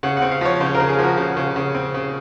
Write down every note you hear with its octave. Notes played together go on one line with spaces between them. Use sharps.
C#3 F#5
F#5
C4
F5
F3 C#5
C#3 C5
A#4
C#3
G#4
F3 F#4
C#3
C#3
C#3
C4
C#3